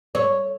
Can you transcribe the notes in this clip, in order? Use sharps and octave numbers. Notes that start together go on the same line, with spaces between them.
C#5